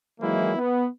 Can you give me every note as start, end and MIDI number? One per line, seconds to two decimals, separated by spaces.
0.21 0.56 51
0.21 0.56 52
0.21 0.56 54
0.21 0.56 56
0.21 0.56 58
0.21 0.56 64
0.56 0.86 59